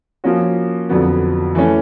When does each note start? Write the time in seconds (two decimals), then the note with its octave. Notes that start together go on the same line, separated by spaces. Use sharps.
0.24 F3 A#3 C#4 F#4
0.89 F2 D3 F#3 B3
1.55 E3 A3 C#4